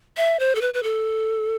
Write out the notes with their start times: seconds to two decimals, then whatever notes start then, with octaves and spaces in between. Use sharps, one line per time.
0.17 E5
0.39 C5
0.55 A4
0.61 B4
0.74 B4
0.83 A4